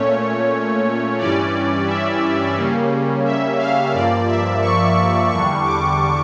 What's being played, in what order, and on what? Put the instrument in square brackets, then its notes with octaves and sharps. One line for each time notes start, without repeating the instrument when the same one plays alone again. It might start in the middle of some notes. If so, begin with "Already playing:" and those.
Already playing: [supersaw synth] A#2 A3 C#4 C#5
G2 E3 G3 C#4 D5
E5
C#3 G3 A#3 C#4
E5
F5
G2 F3 A#3 D5
E5
C#6
C#6
E2 D3 G3 D4 C#6
D6